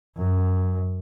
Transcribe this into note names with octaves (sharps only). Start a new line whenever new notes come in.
F#2